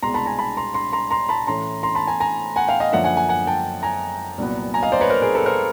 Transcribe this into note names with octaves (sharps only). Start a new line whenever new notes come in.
C2 B2 G#3 A#5 C6
A5 B5
G#5 A#5
A5 B5
A#5 C6
A#5 C6
A#5 C6
A#5 C6
A5 B5
A2 E3 A3 C#4 A#5 C6
A#5 C6
A5 B5
G#5 A#5
G#5 A#5
F#5 G#5
F5 G5
D#5 F5
F#2 D3 F3 A#3 C#4 E5 F#5
F#5 G#5
F#5 G#5
F#5 G#5
G5 A5
G#5 A#5
C2 A#2 F#3 B3
G#5 A#5
D#5 F5
C5 D5
B4 C#5
A#4 C5
G#4 A#4
A4 B4
A#4 C5